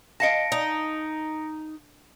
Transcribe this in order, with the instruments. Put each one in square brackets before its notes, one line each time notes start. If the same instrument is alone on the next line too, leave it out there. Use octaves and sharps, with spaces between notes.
[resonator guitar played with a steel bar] D#5 F5 A5 [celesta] A#6 C#7 D7
[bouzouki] D#4